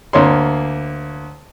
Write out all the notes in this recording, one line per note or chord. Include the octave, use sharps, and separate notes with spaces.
D2 A#3 C#5 C6